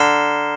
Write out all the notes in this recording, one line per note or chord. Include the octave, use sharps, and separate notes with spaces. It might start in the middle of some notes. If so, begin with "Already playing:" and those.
Already playing: D3 A#5 F6 C7 E7 G7